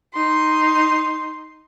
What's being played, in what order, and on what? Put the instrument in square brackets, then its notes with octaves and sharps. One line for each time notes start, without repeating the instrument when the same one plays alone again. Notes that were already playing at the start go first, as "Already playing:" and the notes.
[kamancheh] D#4 C6